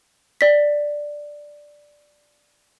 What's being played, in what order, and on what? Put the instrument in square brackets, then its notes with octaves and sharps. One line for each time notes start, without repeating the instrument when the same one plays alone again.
[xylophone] D5 B6